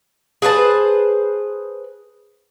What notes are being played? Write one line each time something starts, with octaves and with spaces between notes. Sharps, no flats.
G#4 B4 C5 A5